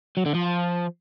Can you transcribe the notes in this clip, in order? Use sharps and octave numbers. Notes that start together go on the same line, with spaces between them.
F#3
D3
F3